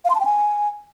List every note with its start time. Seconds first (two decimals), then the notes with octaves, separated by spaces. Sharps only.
0.05 F5
0.10 C6
0.15 A5
0.20 G5
0.25 G#5